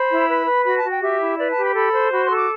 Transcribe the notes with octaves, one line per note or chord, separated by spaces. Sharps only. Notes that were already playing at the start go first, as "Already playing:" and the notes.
Already playing: C5 B5
E4
B4
B4
F#4 B5
A5
F#4
G5
G4 E5
E4
B4 D5
A5
G4
B5
A4 B5
C5
F#4 B5
C6
A4
D6